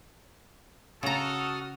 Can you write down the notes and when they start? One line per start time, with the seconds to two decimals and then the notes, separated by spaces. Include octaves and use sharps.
1.03 C#3 F#4 A4 A#5 D#6 F6